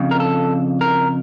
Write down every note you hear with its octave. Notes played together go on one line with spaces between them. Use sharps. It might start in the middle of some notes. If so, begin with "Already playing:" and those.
Already playing: F2 C#3
A#4
A4
A#4